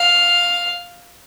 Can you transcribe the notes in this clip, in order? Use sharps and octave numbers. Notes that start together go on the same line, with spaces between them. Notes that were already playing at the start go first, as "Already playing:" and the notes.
Already playing: F5